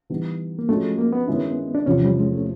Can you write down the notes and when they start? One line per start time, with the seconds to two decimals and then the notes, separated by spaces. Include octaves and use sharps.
0.10 E3 G3 B3 D#4
0.59 A#3
0.69 F3 G#3 A3 C#4 F#4
0.98 A#3
1.12 B3
1.27 G2 D#3 G#3 C#4 E4
1.75 D4
1.86 E2 C3 F3 C#4
2.05 G3
2.18 G#3
2.32 A3